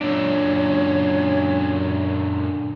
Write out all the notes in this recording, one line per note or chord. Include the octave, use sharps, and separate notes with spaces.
F#2 A#2 D3 D4 C#5